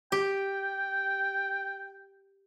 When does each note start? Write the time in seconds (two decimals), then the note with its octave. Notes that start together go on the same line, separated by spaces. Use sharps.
0.12 G4 G5